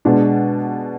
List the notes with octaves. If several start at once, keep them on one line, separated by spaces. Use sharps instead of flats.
B2 G#3 D4